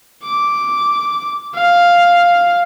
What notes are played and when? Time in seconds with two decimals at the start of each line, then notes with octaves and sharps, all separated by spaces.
0.23 D6
1.55 F5